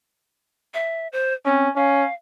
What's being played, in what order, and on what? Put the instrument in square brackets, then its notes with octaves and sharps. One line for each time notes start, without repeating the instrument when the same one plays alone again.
[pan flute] E5
C5
[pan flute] C4 [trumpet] C#4
[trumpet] C#4 [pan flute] F5